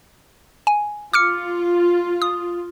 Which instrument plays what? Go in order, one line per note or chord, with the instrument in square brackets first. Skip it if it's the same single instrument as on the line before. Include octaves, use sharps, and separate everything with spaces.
[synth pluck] G#5
[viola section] F4 [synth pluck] D6 F6 C#7
[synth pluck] D#6